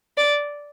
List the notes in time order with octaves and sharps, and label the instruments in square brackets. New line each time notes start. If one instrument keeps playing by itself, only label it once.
[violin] D5